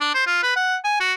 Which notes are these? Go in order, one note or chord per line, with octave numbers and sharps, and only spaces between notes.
D4
C5
F4
B4
F#5
G#5
F#4